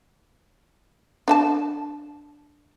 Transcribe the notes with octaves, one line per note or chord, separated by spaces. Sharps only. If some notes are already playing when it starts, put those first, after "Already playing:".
D4 E5 A5